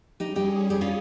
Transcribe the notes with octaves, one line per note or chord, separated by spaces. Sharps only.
G3 C#4 D#4 G4 G#4
D#4 G4
G4
C#4 F4